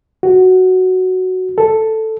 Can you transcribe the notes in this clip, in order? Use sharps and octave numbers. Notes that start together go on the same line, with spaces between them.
F#4
A4